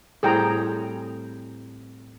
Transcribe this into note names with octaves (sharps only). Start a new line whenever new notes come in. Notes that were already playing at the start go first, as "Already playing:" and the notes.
A2 G3 C4 G#4 G5 A#5